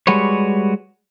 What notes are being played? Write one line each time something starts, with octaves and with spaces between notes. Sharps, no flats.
G3 G#3 F#4 B4 C#5